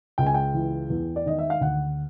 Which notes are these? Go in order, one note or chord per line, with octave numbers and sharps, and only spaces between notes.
C#2 G5
G#5
G5
E3
E2
D5
D#3 D#5
E5
F5
D2 F#5